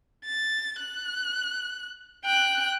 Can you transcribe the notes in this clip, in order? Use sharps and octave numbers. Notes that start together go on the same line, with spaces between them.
A6
F#6
G5 F#6